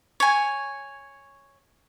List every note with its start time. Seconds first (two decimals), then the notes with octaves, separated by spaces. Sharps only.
0.20 C#5 G#5